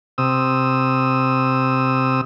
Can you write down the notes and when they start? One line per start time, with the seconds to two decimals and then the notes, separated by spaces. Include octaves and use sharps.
0.18 C3 D#6 E6